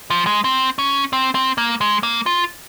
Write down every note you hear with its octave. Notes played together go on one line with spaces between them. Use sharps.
F3
G#3
C4
C#4
C4
C4
A#3
G#3
A#3
F4